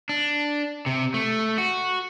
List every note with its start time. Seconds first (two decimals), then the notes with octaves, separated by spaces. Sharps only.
0.09 D4
0.86 C3
1.14 A3
1.58 F#4